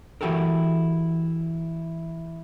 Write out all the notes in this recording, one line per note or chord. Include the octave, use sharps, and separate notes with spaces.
E3 E4 F#4 G4 A4 A#4